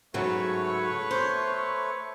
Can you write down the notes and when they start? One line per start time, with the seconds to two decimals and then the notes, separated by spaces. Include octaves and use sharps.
0.14 G#2 C#3 F#3 A3 B4 C#5
1.11 C5